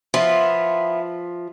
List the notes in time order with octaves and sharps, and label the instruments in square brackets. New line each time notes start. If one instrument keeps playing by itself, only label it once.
[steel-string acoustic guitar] F3 [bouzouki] B3 E4 F4